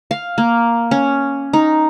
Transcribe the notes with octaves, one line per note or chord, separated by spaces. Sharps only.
F5
A#3
C#4
D#4